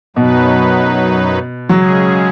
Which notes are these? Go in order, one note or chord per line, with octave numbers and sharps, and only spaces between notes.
F#2 B2 F#3 B3 D#4 B4
C#3 F#3 G#3 C#4 G#4